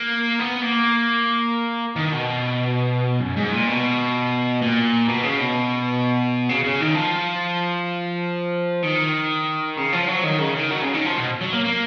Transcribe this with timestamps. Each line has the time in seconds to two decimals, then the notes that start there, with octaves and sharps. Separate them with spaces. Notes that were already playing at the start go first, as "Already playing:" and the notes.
Already playing: A#3
0.40 B3
0.63 A#3
1.96 D#3
2.12 B2
3.21 F#2
3.37 G#2
3.52 A#2
3.68 B2
4.62 A#2
5.08 B2
5.23 C#3
5.39 B2
6.49 C#3
6.64 C#3
6.80 D#3
6.95 F3
8.83 D#3
9.77 C#3
9.93 F3
10.08 F#3
10.23 D#3
10.39 C#3
10.55 D#3
10.70 F#3
10.82 C#3
10.94 D#3
11.05 F3
11.17 B2
11.41 F#3
11.53 A#3
11.65 A#3